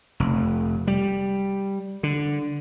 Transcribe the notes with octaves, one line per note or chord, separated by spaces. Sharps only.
F1
G3
D3